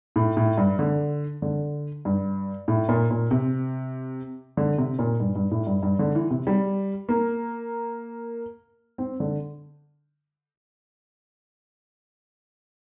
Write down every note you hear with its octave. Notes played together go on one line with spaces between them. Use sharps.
A2
A2
G2
D3
D3
G2
A2
A#2
A#2
C3
D3
C3
A#2
G2
G2
A2
G2
G2
D3
E3
C3
G3
A#3
C4
D3